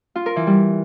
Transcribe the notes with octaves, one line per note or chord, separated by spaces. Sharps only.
F4
A#4
E3
G3